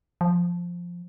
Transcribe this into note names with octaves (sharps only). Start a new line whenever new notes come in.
F3